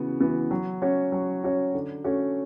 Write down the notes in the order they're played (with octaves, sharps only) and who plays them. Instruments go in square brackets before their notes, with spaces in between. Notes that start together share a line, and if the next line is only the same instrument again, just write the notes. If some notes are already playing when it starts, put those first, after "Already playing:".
Already playing: [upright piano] C#3 E3 B3 F#4
E3 B3 F#4
F#3
C#4 F#4 C#5
F#3
C#4 F#4 C#5
D3
A3 C#4 F#4